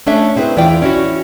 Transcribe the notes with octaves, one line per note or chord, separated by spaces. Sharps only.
A3 C#4 D4 E5
C4 E4 G#4 B4
E2 E3 E4 F4 D5 G5
C#4 E4 F#4